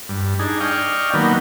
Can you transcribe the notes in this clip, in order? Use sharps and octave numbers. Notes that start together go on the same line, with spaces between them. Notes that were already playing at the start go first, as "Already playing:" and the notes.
G2
D4 D#4 G#4
D5 D#5 F5 G5 C#6
D#3 F#3 A#3 B3